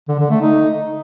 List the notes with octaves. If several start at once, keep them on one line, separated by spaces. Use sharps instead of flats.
D3
D3
A3
D#4